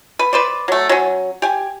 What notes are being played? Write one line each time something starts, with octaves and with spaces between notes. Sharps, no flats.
B4
B4 C5 D5
F#3 A3
F#3 C#4
G4 G#5